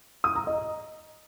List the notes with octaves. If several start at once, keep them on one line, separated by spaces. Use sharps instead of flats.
D#6
A#5
D#5